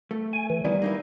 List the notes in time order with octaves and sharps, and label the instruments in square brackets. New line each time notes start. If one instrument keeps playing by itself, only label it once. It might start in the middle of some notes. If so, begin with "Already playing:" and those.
[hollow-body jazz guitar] A3
[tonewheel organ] G#5
E3
[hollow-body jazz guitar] D#3 B3 E4 [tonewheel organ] G3
[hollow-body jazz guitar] A#3 D#4 E4